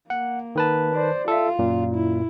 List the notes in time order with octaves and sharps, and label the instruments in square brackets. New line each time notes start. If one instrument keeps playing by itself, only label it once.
[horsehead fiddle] A#3 [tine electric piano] F#5
[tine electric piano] D#3 B4 A5
[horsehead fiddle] C5 D5
[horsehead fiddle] F4 [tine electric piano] A4 E5
[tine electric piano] F#2 A#2
[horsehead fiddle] E4